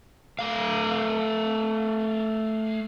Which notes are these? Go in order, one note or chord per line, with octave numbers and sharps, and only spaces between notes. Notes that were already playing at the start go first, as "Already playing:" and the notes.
A3 F5